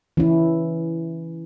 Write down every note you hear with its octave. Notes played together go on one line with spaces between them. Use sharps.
E3 C#4 E4